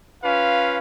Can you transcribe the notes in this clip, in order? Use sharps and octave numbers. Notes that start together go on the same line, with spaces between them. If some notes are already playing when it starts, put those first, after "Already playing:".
C#4 F4 B4 F5